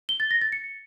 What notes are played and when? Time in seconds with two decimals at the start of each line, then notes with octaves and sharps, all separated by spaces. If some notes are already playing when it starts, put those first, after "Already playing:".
0.09 G7
0.20 A6
0.31 A#6
0.42 A6
0.52 C#7